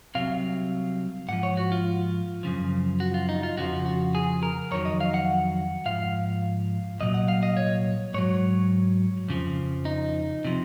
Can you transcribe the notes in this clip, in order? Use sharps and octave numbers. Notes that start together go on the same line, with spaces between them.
C2 C3 F#3 F5
G#2 F3 F#5
C#5
F#4
F4
F#2 C#3 F3
F#4
F4
D#4
F4
F2 C#3 F3 F#4
F#4
G#4
A#4
F2 D#3 F#3 C#5
D#5
F5
F#5
G#2 F3 F5
C2 A#2 F#3 D#5
F#5
F5
D#5
C#5
G#2 F#3 C#5
F2 C#3 F3
D#4
C3 F3